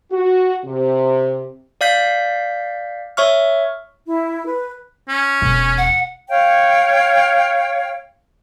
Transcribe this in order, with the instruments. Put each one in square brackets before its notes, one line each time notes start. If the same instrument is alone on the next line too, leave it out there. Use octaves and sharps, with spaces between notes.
[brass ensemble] F#4
C3
[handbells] D5 F5 G6 B6
C#5 E5 C#6 F6
[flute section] E4
B4
[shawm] C#4
[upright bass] E1
[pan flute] F#5
[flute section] C#5 F5 G5